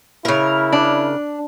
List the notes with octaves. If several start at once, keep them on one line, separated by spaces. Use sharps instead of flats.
C#3 E4 A#4
D4